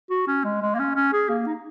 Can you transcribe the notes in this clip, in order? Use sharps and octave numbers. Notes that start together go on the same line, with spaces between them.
F#4
C#4
G#3
G#3
A#3
C#4
C#4
G#4
A#3
D#4